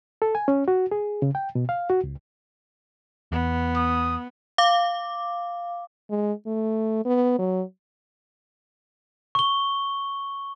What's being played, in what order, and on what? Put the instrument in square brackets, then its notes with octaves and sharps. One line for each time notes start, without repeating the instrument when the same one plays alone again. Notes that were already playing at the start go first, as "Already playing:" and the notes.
[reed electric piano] A4
G#5
C#4
F#4
G#4
C#3
G5
B2
F5
F#4
C#2
[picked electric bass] E2 [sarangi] B3
[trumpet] D#6
[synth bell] F5 D6
[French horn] G#3
A3
B3
F#3
[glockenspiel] C#6 G7